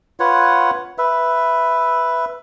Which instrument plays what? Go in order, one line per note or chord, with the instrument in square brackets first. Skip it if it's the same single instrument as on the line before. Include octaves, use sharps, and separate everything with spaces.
[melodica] F4 B4 C#5 F#5
B4 E5